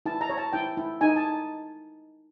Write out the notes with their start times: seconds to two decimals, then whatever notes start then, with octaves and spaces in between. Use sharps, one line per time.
0.06 E4 A5
0.21 A#5
0.29 C#5
0.37 A5
0.53 E4 G5
0.77 E4
1.01 D#4 G#5
1.16 A5